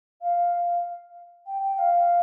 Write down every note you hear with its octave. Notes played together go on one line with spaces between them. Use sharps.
F5
G5
G5
F5